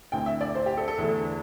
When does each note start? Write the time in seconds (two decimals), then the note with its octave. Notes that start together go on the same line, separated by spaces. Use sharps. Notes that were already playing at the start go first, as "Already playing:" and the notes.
0.12 D2 D3 C4 E4 G5
0.26 E5
0.41 D5
0.55 C5
0.66 G4
0.77 A4
0.88 A4
0.98 E2 D3 A3 E4